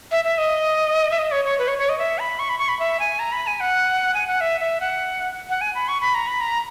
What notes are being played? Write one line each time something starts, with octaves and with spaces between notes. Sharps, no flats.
E5
E5
D#5
E5
D#5
C#5
C#5
B4
C#5
C#5
D#5
E5
B5
C#6
B5
C#6
B5
E5
G#5
A#5
B5
G#5
F#5
G#5
F#5
E5
E5
F#5
F#5
G#5
B5
C#6
B5
A#5
B5
A#5